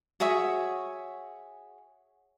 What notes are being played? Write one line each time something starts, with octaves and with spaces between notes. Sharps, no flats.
F#4 G#4 C#5 E5